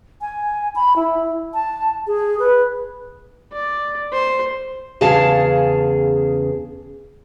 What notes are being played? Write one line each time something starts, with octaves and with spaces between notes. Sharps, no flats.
G#5
B5
E4
A5
G#4
B4
D5
C5
E2 C#3 G#4 F5 A5